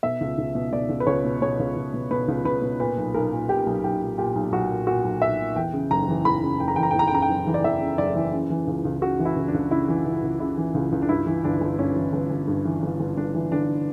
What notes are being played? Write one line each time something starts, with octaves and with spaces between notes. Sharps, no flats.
B2 E5
C#2
C#2
B2
B2 D5
C#2
B4
C#2 C#5
B2
B2 C#5
C#2
C#2
B2
B2 B4
C#2
C#2 B4
B2
A#2 B4
B1
B1 A#4
A#2
A#2 G4
B1
B1 G4
A#2
A#2 G4
B1
B1 F#4
A#2
A#2 F#4
B1
B1 E5
A#2
E2 G5
C#3
F#1 A#5
E3
E2 B5
C#3
F#1 G5
A#5
E3 G5
A#5
G5
E2
A#5
G5
C#3 A#5
G5
F#1
E3
D5
E2 E5
C#3
F#1 D5
E3
C#3
E3
C#2
C#2
C#3 F#4
E3
E4
C#2
D4
C#2
C#3 E4
E3
C#2
C#2
C#3 E4
E3
C#2
C#2
D4
G2 E4
E3
G1 D4
G1
G2 C#4
E3
G1
G1
G2
E3
G1
G1
G2 D4
E3
G1 D4